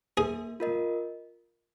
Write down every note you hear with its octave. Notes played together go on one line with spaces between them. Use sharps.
A#3 G#4
F4 A#4 D#5